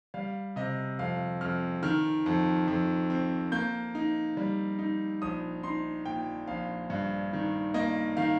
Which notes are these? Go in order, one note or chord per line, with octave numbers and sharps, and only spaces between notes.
G3 F5
C3 D#5
F2 F5
F2 F6
D#3 F6
F2
F2
C4
A#3 G6
D#4
G3
D#4
A#1 D#6
D#4 C6
A#2 G5
A#1 F5
G2
D#3
A#3 D#5
D#3 F5